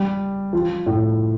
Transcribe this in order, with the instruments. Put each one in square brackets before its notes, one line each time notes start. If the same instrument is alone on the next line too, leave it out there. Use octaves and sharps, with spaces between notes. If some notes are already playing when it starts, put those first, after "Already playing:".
Already playing: [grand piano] G3
F3
A2